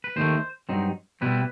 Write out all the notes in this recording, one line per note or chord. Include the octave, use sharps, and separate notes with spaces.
B4
D#2 D#3 A3 C5
G2 F#3 C4 D#4
B2 G3 C4 E4 B4